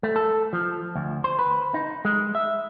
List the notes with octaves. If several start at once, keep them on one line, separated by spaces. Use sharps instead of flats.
A3
A4
F3
D2
C5
B4
D#4
G#3
E5